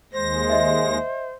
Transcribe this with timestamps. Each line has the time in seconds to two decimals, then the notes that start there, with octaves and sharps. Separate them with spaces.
0.13 D#2 G#3 C5 A#6
0.50 D#5 E5